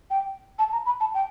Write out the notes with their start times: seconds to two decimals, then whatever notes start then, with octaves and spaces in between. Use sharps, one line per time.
0.10 G5
0.59 A5
0.72 A#5
0.86 B5
1.00 A5
1.14 G5